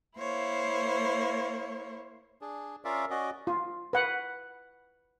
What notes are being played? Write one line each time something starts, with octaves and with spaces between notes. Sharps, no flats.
A#3 E4 C5 C#5
D4 G#4
C#4 F4 A#4 D5 E5 F5
C#4 F#4 D5 D#5
F4
B4 F#5